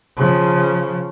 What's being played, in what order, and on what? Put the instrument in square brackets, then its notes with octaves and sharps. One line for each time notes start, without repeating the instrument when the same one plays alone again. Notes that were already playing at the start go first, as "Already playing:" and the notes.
[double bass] C#3 F3